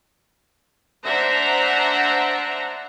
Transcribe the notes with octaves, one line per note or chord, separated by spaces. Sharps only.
D4 C5 E5 F#5 A#5